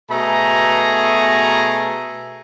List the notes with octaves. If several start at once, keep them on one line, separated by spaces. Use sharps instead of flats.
B2 A3 G#4 A#5